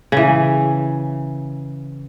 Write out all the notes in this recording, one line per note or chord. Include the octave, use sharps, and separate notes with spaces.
C#3 E3